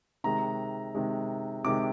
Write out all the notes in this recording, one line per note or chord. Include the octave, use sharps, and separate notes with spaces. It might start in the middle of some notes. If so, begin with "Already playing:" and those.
C3 D#3 G#3 A#5
C3 D#3 G#3
C3 D#3 G#3 D6